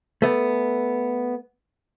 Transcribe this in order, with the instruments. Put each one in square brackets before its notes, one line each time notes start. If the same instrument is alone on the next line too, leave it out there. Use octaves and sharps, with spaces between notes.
[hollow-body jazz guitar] A3 B3